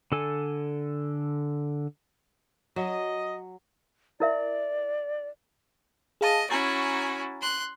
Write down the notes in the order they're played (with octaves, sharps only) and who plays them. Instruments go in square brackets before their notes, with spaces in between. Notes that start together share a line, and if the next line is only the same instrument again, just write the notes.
[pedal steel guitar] D3 A4 G#5
[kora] F#3 [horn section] D#5
[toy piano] E4 A#4 E5 [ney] D5
[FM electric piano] G#4 F5 A5 [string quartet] D#5
[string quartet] C#4 E4 F#4 [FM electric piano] G#5 A#5 A6
[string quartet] C6 F#6